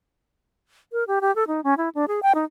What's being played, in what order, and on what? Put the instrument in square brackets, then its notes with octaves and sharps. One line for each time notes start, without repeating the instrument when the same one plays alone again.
[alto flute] A#4
G4
G4
A4
D#4
C#4
E4
D4
G#4
G5
D#4